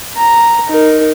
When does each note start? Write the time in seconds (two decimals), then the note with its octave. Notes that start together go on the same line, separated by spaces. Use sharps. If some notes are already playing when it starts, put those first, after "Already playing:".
0.17 A#5
0.69 D#4 A#4